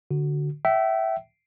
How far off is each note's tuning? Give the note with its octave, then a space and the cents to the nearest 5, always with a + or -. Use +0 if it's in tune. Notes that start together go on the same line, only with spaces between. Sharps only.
D3 +0 F#4 +0
E5 +0 G5 -35